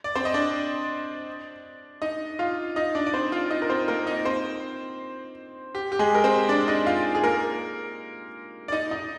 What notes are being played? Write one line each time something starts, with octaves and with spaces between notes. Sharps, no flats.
D5
C4 C5
D#5
D4 D5
D#4 D#5
F4 F5
D#4 D#5
D4 D5
D5
C4 C5
F4 F5
D#4 D#5
A#4
C4 C5
A#3 A#4
D#4 D#5
C4 C5
G4
G4
G#3 G#4
A#4
C4 C5
D4 D5
D#4 D#5
F4 F5
G#4
A#3 A#4
D5
D#4 D#5
D#4 D#5